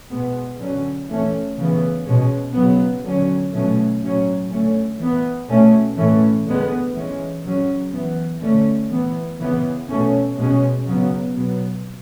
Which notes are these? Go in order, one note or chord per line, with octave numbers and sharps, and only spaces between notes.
B2 G#3 B3
D3 F#3 C#4
E3 A3 C#4
C#3 E3 B3
B2 G#3 C#4
C#3 F#3 B3
D3 F#3 C#4
B2 F#3 A3 C#4
A2 F#3 C#4
D3 A3 C#4
E3 B3
B2 A3 C#4
A2 E3 A3 C#4
D3 G#3 B3
E3 G#3 C#4
C#3 F#3 C#4
E3 B3
D3 A3 C#4
E3 B3
C#3 E3 B3
B2 A3 C#4
B2 G#3 C#4
C#3 F#3 B3
B2 F#3 B3